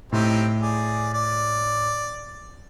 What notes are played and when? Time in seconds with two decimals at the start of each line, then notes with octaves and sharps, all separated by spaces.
0.12 A2 C4 D#4 G4
0.61 G#4 D5
1.14 D5